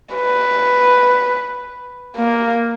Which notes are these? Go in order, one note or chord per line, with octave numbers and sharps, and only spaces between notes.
B4
A#3